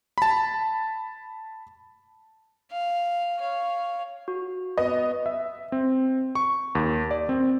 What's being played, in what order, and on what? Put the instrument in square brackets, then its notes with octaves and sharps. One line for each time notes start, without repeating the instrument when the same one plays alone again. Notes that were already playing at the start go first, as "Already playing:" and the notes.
[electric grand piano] A5 B5
[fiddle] F5
C#5 F5
[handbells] F#4
[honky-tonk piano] B3 D#5
[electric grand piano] E5
C4
C#6
D#2
D5
C4